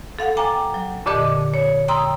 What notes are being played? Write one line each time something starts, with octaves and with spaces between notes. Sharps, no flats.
A4 F5 F#5
G5 G#5 A#5 D6
F#3
F2 A#2 D3 G4 D#5 D6
C#5
G5 A#5 C6 D#6 E6